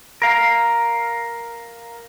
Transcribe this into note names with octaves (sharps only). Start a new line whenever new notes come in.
A#4 F5